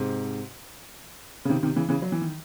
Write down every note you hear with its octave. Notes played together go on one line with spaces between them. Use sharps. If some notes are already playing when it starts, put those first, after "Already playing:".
Already playing: G#2 C3
C#3
C3 D#3
C3 D#3
C#3 E3
C#3 E3
F#3
E3
D#3